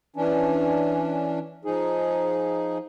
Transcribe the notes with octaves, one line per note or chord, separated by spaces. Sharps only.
E3 C#4 D4
F3 D#4 G#4